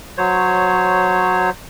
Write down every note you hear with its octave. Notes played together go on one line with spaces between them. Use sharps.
F#3 C5 C#5